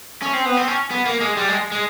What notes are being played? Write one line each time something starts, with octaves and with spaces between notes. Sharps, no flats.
C#4
C4
B3
C4
C#4
B3
A#3
G#3
G3
G#3
G#3